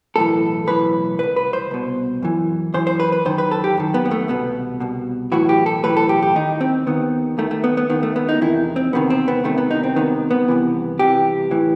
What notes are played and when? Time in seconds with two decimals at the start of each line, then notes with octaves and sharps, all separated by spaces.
0.16 B1 A2 E3 A4
0.67 B1 A2 E3 B4
1.19 C2 B2 B4
1.36 B4
1.53 C5
1.71 C2 B2
2.23 F#2 E3
2.74 F#2 E3 C5
2.87 C5
3.00 B4
3.12 B4
3.25 F#2 D#3 C5
3.38 B4
3.51 A4
3.64 G4
3.77 F#2 D#3
3.94 B3
4.05 B3
4.11 A3
4.28 C2 B2 B3
4.80 C2 B2
5.32 B1 A2 E3 F#4
5.49 G4
5.66 A4
5.84 B1 A2 E3 B4
5.97 A4
6.09 G4
6.22 G4
6.35 D#2 D#3 D#4
6.61 C4
6.87 D#2 D#3 B3
7.38 D#2 D#3 A3
7.51 A3
7.64 B3
7.77 B3
7.90 D#2 D#3 B3
8.03 A3
8.16 B3
8.29 D#4
8.41 E2 C3 D#3 E4
8.76 C4
8.93 E2 C3 D#3 B3
9.10 C4
9.28 B3
9.44 C2 C3 D#3 A3
9.58 B3
9.71 D#4
9.83 C4
9.96 C2 C3 D#3 B3
10.31 B3
10.48 C2 C3 E3
10.99 C2 C3 E3 G4
11.51 A2 E3